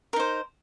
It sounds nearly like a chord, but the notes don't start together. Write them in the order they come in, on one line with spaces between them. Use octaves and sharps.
A#4 D#4 C5